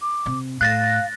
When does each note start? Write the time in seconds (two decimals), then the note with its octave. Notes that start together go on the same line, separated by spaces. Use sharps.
0.02 D6
0.26 C3
0.61 A2 F5 F#6 A6 A#6